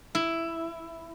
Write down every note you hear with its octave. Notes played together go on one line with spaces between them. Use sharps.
E4